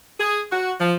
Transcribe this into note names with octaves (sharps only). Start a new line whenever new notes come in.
G#4
F#4
F3